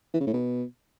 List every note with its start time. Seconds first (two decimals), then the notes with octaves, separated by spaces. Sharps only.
0.14 E3
0.21 C#3
0.27 A2
0.33 B2